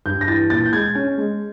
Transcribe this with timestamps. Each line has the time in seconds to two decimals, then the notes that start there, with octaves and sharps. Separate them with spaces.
0.06 G2 G6
0.21 A#6
0.28 E3 A6
0.50 A#2 A6
0.66 G6
0.73 G#3 G#6
0.95 C#4
1.18 G#3